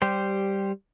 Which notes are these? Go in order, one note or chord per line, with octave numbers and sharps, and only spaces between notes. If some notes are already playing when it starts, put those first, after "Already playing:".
G3 G4 C5